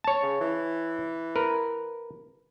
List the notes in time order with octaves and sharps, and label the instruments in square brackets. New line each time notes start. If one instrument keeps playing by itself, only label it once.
[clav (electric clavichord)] C#5 A5
[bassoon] C#3
E3
[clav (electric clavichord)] A#4 B4